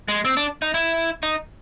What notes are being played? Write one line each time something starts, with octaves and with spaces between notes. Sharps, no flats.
G#3
C4
D4
D#4
E4
D#4